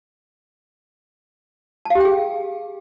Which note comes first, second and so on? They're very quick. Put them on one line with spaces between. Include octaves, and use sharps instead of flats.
A5 F5 G4 G5 G#4